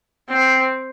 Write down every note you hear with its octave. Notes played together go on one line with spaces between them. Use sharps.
C4